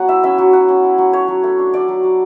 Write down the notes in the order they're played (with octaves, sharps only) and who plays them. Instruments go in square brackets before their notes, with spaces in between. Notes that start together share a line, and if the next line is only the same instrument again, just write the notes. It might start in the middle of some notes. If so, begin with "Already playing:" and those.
Already playing: [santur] F#3 B3 F#5
E4 E5
C#4 E5
F#3
F#3 F#5
C#4
E4
F#3
A3 C#5
F#3
A3
D4
A3 D5
F#3
F#3